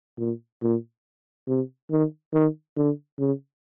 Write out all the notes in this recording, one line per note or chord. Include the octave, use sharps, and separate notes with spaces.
A#2
A#2
C3
D#3
D#3
D3
C#3